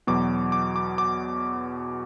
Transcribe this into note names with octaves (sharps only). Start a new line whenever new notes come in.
E2 B2 F#3 D6
D6
D6
D6